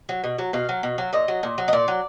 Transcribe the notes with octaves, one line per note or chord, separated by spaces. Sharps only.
F#3
B2
F#3
B2 F5
F#3
B2
F#3
A#2 D#5
F#3
A#2
F#3
D#5
A#2 D5
F#3